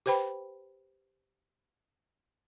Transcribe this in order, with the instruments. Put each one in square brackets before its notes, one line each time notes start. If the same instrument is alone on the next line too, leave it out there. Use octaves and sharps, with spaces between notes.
[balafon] G4 B4 C5 G5 B5